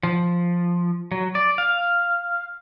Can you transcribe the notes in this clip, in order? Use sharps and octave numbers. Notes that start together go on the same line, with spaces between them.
F3
F#3
D5
F5